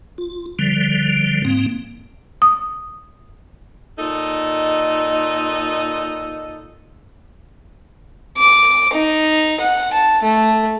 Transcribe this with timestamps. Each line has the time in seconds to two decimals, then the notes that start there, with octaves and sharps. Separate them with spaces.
0.18 F4
0.59 D3 F3 G3
1.45 G#2 A#3 C4
2.42 D#6
3.98 A#2 D#4 A4 D#5
8.38 D6
8.93 D#4
9.60 F#5
9.93 A5
10.23 A3